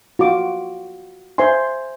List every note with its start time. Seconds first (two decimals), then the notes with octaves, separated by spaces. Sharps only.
0.19 F4 F#4 D6
1.38 C5 E5 G5 G#5 C6